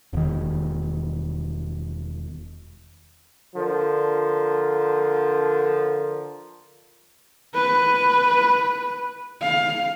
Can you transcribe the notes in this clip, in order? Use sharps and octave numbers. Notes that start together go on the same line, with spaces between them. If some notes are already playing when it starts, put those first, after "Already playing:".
E1 D#3
D3 F3 A#4
B4
F5